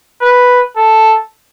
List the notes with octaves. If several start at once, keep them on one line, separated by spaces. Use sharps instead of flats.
B4
A4